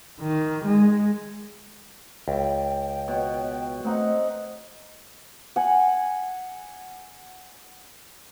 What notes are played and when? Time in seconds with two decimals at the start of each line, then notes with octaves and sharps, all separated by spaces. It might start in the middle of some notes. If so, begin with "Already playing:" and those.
0.21 D#3
0.65 G#3
2.28 C#2 G5
3.08 B2 C#5
3.84 A3 C4 D#4 F#5
5.56 F#5 G#5